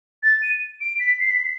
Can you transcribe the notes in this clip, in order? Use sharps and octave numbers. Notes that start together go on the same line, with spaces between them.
A6
D#7
D7
B6
C7
B6
C7